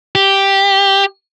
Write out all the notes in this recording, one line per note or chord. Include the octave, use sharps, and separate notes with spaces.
G4